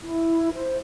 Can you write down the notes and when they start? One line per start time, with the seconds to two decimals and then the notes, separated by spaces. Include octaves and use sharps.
0.03 E4
0.52 C5